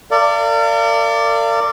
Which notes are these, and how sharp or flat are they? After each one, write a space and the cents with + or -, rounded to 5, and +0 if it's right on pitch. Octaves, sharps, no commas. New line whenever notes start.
A#4 -40 D5 +0 F5 -35